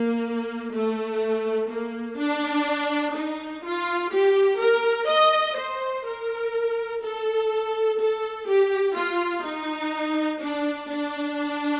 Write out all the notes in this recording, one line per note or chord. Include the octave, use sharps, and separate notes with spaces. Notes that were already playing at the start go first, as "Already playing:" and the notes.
Already playing: A#3
A3
A#3
D4
D#4
F4
G4
A#4
D#5
C5
A#4
A4
A4
G4
F4
D#4
D4
D4